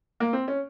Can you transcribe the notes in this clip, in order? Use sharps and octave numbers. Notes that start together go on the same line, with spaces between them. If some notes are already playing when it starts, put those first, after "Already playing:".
A#3
C4
C#4